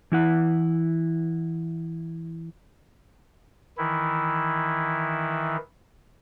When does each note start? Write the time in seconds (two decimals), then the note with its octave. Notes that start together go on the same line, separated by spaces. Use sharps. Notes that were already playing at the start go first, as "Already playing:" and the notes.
0.12 E3 E4 F#5
3.78 D#3 E3 E4